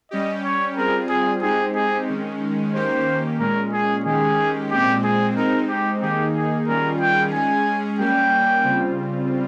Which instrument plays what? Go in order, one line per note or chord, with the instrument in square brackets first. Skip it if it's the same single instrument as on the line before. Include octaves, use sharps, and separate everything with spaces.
[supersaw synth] G3 C#4 G4 [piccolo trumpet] D#5
[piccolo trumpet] C#5
[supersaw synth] G3 C4 F4 G#4 [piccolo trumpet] A#4
[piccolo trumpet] G#4
[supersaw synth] G#3 C4 D#4 G4 [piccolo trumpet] G#4
[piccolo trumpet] G#4
[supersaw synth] D#3 G#3 C#4
[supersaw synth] D#3 A#3 C#4 G4 [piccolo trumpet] C5
[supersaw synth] A#2 G#3 C#4 [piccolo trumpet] A#4
[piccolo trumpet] G#4
[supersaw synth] D#3 G#3 C#4 G4 [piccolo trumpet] G#4
[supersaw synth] A#2 G#3 C4 [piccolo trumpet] G4
[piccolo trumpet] G#4
[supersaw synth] G#3 C4 D#4 [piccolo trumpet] A#4
[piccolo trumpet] G4
[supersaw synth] D#3 A#3 D#4 G#4 [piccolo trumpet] G4
[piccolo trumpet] G#4
[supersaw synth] D#3 G3 C#4 F4 G#4 [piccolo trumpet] A#4
[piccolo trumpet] G5
[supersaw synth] G#3 C#4 G#4 [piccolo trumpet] G#5
[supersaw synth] G3 A#3 C#4 G4 [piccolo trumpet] G5
[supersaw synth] C#3 G3 C4 F4